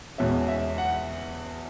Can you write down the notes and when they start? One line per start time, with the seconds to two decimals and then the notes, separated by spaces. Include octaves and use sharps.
0.18 E2 B2 G#3 C#4 E5
0.48 E5
0.78 F#5